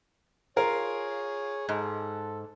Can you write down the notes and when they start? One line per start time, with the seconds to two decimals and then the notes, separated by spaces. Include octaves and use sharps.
0.57 F4 G#4 A#4 C#5
1.69 G#2 A4